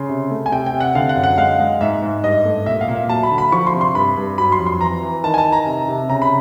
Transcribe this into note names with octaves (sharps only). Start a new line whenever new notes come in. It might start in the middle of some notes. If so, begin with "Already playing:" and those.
Already playing: C#3 C6
C3
A3
G#5
C3 G5
G5
C3
F#5
D3 F5
F#5
F#2
F#5
G#3 F5
G#3
G#2 E5
G#2
G2 D#5
A3
A#2 E5
F5
A#2
E5
F#3 A5
B5
D3
B5
F3 C#6
C6
C3
C6
G2 B5
G2
F#3 B5
C6
F2
C6
E3 A#5
E3
D#3 A5
G#5
A5
D#3
A#5
C3
C3
C#3 A#5
B5